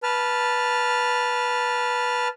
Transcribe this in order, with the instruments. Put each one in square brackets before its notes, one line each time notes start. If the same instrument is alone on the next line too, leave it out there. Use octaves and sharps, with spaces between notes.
[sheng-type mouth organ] B4 A5 F6